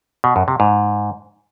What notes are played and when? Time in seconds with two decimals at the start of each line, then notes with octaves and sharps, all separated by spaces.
0.24 B2
0.36 F#2
0.48 C3
0.60 G#2